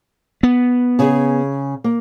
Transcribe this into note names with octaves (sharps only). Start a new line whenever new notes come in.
B3
C#3 G#4
A#3